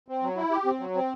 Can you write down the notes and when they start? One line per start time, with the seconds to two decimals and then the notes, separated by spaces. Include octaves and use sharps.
0.08 C4
0.23 F#3
0.37 E4
0.51 G4
0.65 C4
0.80 F#3
0.95 C4